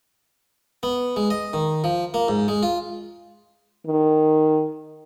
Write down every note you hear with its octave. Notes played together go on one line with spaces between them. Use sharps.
B3
G#3
D#5
D#3
F3
A#3
G#2
G#3
F4
D#3